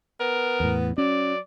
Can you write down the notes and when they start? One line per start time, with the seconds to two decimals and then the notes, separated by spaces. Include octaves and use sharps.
0.20 B3 A#4
0.60 E2 A2
0.98 F#3 C#4 D5